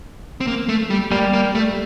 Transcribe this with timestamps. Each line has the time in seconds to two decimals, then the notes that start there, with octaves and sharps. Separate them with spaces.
0.41 C4
0.47 A#3
0.69 A3
0.90 G3
1.11 G3 A#3
1.33 A#3
1.55 A3